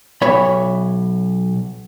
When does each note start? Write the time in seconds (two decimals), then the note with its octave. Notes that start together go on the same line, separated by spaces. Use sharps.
0.22 B1 C#5 E5 B5